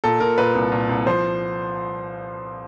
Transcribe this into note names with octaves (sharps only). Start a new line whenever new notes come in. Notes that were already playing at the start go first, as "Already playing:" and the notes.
A#2 A4
A#2 A#4
A#2 B4
C2
A#2
C2
F3 C5